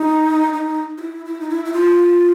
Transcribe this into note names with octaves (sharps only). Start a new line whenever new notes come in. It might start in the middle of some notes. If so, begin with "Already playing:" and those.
Already playing: D#4
D#4
F4
E4
E4
D#4
E4
E4
F4